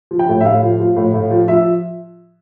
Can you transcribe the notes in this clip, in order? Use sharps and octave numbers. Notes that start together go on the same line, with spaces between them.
F3
G5
A2
E5
A2 F5
F3
F3
A2
A2
F3
F3 E5